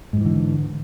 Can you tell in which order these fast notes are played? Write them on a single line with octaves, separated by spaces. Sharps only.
G#2 F3 E3 D3